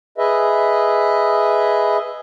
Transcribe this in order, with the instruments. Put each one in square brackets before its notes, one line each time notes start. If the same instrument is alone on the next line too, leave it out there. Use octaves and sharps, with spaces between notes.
[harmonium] G#4 B4 D#5 E5